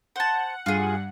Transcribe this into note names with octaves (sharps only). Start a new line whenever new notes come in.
C5 F#5 A5
G2 F4 G#4 F#5